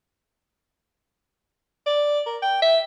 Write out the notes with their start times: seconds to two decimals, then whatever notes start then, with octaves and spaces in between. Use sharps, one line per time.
1.86 D5
2.26 A#4
2.42 G5
2.62 E5